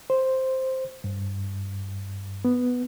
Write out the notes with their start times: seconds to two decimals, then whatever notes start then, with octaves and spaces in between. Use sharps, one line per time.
0.10 C5
1.04 G2
2.45 B3